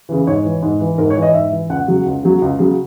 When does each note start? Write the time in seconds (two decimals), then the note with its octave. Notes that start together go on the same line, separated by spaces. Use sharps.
0.09 C#3 E3
0.27 G#2 C#5
0.45 E3
0.62 G#2
0.80 E3
0.98 G#2 A#4
1.10 C#5
1.16 E3
1.22 D#5
1.34 G#2 E5
1.51 E3
1.69 C#2 F#5
1.87 C#3 F#3
2.06 C#2
2.23 C#3 F#3
2.42 C#2
2.59 C#3 F#3